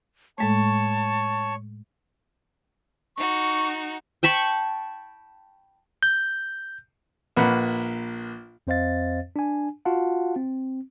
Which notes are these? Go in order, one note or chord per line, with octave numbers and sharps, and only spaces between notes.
A2 G#3 A3 C#5 A5 C#6
D#4 F#4 C#6
G5 A5 B5 C#6
G6
A#1 A#3 B4 F#5 B5
F2 C4 C5 D#5 F5 A6
D4 G#5
F4 F#4 F5 F#5 A5
C4